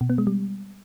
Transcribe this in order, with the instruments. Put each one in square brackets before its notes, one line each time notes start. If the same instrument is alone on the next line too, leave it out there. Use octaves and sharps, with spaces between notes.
[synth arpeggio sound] B2
B3
G#3
G3